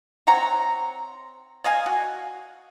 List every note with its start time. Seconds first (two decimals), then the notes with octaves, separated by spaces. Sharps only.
0.27 C4 C#5 F#5 A#5
1.64 D5 D#5 F5 G#5
1.86 F#4